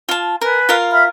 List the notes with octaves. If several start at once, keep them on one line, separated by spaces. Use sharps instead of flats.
F4 A5
A#4 B4 G#5
F4 A#4 F5
E5 B5 F6